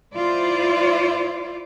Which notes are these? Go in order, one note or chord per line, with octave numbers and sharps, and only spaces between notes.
E4 F4 C5 D5